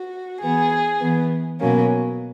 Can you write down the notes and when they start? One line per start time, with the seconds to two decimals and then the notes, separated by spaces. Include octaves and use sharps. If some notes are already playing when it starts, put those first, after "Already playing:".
Already playing: F#4
0.40 E3 B3 G#4
1.01 E3 B3
1.60 B2 F#3 A#3 C#4